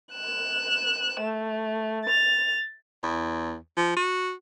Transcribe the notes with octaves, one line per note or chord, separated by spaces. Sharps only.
F#6 E7
A3
A6 F7
E2
F3
F#4